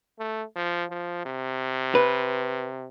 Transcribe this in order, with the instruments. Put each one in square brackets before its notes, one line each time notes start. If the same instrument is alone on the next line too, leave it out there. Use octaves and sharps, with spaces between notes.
[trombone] A3
F3
F3
C3
[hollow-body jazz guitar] B4